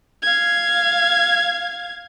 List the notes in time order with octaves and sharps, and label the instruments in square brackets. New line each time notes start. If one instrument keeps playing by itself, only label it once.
[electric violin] F5 G#6